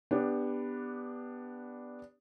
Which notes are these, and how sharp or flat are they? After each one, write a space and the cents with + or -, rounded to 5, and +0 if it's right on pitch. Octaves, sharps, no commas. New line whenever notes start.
B3 +0 D4 +0 G4 +15